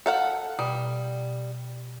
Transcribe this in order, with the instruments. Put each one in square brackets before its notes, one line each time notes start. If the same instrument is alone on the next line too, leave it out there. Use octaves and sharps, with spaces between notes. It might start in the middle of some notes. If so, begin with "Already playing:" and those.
[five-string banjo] A4 F5 F#5
[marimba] B2 [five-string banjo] G3